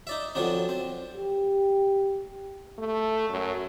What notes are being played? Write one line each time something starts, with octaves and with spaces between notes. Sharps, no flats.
D#4 D5 E5
D3 F3 F#3 C4 D4
C4
G4
A3
F#2